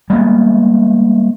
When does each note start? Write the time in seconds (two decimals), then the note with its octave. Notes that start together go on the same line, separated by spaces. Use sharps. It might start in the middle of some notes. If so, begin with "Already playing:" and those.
0.10 G3 G#3 A#3 B3